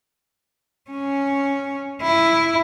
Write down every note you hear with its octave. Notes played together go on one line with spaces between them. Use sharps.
C#4
E4